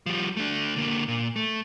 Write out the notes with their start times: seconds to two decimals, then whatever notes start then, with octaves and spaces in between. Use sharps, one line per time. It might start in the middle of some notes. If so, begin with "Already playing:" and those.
0.06 F3 G3
0.37 A3 D4
0.76 D3 A#3
1.08 A#2
1.36 A3